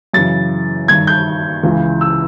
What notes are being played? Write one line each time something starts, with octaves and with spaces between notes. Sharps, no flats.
F#2 C#3 E3 A6
G2 D#3 G#6
G6
C#2 C#3 E3
E6